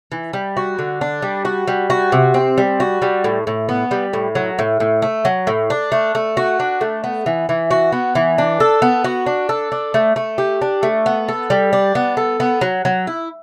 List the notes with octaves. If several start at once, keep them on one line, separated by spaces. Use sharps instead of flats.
E3
G3
F#4
D3
D4
G3
F#4
G3
F#4
C3
C4
G3
F#4
G3
A2
A2
B3
G3
A2
F#3
A2
A2
A3
F#3
A2
D4
A3
A3
F#4
D4
A3
B3
E3
E3
F#4
B3
E3
D4
A4
B3
F#4
D4
A4
D4
A3
A3
G4
D4
A3
B3
A4
G3
D4
B3
A4
B3
F#3
F#3
E4